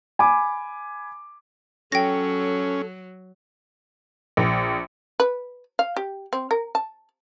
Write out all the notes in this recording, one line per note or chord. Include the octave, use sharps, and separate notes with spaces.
G#5 B5 D6
F#3 C#4 A4 G5 A#6
A#1
B4
F5
G4
C4
A#4
A5